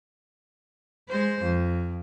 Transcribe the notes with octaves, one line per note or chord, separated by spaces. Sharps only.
G#3 C5
F2